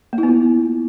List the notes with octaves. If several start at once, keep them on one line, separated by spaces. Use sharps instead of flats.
A#3
E4
B3
F4